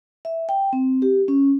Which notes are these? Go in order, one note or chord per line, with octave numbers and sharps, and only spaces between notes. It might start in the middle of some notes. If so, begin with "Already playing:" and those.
E5
G5
C4
G4
C#4